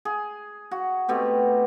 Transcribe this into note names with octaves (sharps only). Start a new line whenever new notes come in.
G#4
F#4
B2 A3 C4 G4